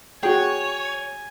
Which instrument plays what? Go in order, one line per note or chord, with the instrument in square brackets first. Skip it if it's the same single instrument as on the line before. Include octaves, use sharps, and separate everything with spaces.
[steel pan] F#4 G5 [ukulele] G#4 [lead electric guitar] C#5 [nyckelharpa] G#5